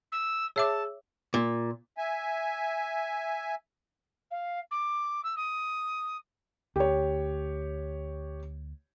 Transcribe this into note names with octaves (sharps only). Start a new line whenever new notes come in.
E6
G#4 C#5 E5 A5 D6 E6
A#2
E5 G#5
F5
D6
E6
D#6
D2 G4 C#5